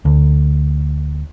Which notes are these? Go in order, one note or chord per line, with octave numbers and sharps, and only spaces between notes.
D2